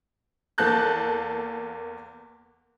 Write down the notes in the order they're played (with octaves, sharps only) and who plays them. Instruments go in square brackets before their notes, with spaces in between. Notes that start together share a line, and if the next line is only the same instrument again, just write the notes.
[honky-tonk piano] E2 A#3 A4 A5 F#6 G6